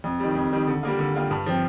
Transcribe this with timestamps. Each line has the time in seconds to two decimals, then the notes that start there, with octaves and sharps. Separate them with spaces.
0.04 F2
0.20 D#3 G3
0.35 F2
0.52 D#3 G3
0.67 D3
0.83 G3 A#3 F4
0.99 D3
1.15 G3 A#3 F4
1.31 G2
1.46 F3 C4